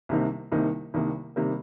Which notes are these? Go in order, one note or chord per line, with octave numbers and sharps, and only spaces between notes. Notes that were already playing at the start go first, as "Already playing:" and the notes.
C2 C3 D#3 A#3 D#4
C2 C3 D#3 A#3 D#4
C2 C3 D#3 G3 A#3
C3 D#3 G3 A#3